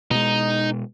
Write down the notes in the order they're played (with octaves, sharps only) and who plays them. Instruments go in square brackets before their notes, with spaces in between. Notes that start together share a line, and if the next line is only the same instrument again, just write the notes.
[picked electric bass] B2 G#3 [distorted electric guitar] D#4